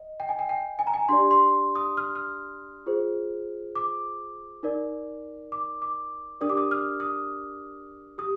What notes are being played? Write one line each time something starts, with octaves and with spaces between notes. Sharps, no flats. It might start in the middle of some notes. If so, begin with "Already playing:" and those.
Already playing: D#5
G5
G#5
G5
G5
G#5
A#5
G#5
D4 G4 D5 C6
C6
D#6
F6
F6
F4 G#4 C5
D6
D#4 A#4 D5
D6
D6
D4 G4 A#4 D5 D#6
D6
D#6
F6
D#6
G4 D#6